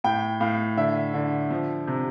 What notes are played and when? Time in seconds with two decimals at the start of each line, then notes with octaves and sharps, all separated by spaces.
0.04 A2 G5
0.40 A2 F5
0.77 D3 E5
1.14 D3
1.50 F3
1.87 C3